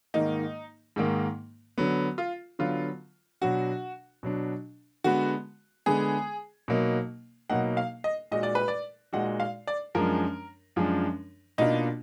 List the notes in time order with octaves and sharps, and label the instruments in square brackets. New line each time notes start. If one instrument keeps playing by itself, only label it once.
[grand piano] G#2 D#3 A#3 [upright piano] D#4
[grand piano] G#2 D#3 A#3
D3 F#3 B3
[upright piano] F4
[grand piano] D3 F#3 B3 [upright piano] F4
[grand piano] B2 F#3 D4 [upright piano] F#4
[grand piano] B2 F#3 D4
[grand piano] D3 G#3 B3 [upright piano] F#4
[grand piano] D3 G#3 B3 [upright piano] G#4
[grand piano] B2 F#3 A#3 D#4
[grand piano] B2 F#3 A#3 D#4 [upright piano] F#5
[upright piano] F5
D#5
[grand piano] A#2 G#3 D#4 F#4 [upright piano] D#5
[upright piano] D5
B4
D5
[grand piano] A#2 G#3 D#4 F#4 [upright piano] F#5
[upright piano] F5
D5
[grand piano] F#2 F3 G#3 D4 [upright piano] A#4
[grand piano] F#2 F3 G#3 D4
[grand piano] B2 A#3 D4 F4 [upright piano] D#4